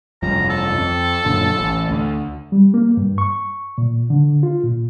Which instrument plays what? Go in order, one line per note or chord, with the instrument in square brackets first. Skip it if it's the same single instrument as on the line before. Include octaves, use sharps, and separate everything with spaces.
[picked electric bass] F1 G2 F3 [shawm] A#5
[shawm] A4
[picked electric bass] F2
F#2 A#2 D3
A1
D2
[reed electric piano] G3
A#3
G2
C#6
A#2
D3
F4
A#2